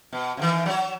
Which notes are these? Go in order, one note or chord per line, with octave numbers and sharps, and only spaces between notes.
B2
C3 D#3 E3
F#3 C#5